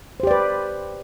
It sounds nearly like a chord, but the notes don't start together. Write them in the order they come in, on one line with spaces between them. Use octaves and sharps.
C5 G4 D5 B4